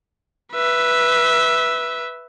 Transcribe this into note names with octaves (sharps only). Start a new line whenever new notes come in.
B4 E5